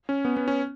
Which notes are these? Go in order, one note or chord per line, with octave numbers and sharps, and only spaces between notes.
C#4
B3
B3
C#4